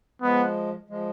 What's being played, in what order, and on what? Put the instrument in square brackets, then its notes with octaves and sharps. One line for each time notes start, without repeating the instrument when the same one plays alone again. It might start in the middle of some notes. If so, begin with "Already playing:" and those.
[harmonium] F3 G#3 [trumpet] B3
[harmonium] F3 G#3